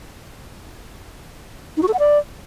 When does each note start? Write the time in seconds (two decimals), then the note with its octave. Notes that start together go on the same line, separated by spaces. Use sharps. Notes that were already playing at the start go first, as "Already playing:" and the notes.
1.77 D#4
1.82 F#4
1.88 A4
1.93 F#5
1.99 D5